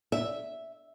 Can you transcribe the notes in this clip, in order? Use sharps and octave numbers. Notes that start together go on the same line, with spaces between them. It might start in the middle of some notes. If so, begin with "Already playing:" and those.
E5